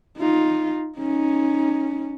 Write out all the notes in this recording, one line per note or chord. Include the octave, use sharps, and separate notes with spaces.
D#4 F4
C#4 D#4